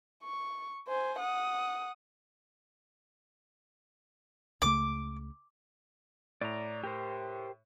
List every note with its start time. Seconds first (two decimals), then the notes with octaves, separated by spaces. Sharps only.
0.23 C#6
0.88 C5 G#5
1.19 F#5 D#6
4.62 C#2 C#3 A3 D6
6.41 A2 D5 A#5
6.84 G4 A#4 C5